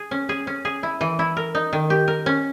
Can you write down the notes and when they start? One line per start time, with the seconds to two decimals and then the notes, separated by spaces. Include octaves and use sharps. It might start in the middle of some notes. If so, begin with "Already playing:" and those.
Already playing: G#4
0.11 C#4
0.29 G#4
0.47 C#4
0.65 G#4
0.83 E4
1.01 E3
1.19 E4
1.37 A#4
1.55 D#4
1.73 D#3
1.90 G4
2.08 A#4
2.26 C#4